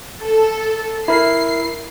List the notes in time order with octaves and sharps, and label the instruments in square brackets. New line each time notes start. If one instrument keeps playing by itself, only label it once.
[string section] A4
[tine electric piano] E4 A#4 [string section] C7